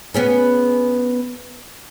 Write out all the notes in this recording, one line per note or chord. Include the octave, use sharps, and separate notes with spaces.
B3 C#4 G#4